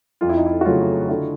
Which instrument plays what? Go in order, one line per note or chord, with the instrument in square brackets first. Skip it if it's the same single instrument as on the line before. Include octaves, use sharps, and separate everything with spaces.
[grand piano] F2 [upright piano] F4
[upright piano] E4
D#4
E4
F#4
[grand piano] C#3 F#3 A3 [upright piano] F4
[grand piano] D3 [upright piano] F#4